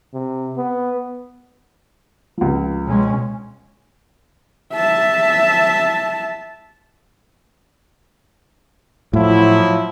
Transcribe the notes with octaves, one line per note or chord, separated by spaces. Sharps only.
C3
B3
C#2 F3
B2 G#3 C#4
E5 A5
A2 F3 F#3 E4